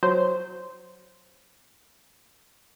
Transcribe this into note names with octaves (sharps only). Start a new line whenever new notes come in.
F#3 C5